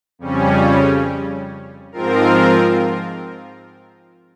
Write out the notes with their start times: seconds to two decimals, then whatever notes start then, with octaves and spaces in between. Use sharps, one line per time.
0.19 F2 C#3 G3 C#4
1.92 G#2 F3 C4 F4 A#4